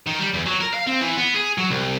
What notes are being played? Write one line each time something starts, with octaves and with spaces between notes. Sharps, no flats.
D#3
G3
E2
F#3
A#4
F5
C4
E3
B3
G#4
F#3
C2